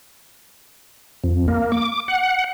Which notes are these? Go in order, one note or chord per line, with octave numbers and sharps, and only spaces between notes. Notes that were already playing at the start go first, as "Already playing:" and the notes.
F2
A#3
D6
F#5